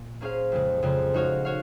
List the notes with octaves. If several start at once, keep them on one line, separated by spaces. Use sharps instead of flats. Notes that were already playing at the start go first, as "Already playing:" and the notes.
Already playing: A#2
A#3 C#4 G#4 C5 F5
F2 C#3 G#3
F2 C#3 G#3
G#3 D#4 F#4 C#5 F5
F#4 C#5 F5